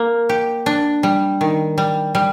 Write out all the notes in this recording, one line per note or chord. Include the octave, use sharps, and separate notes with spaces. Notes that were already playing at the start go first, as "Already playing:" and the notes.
Already playing: A#3
G4
D4
G3
D#3
G3
G3